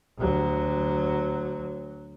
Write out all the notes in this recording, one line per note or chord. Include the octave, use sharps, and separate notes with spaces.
D2 F#3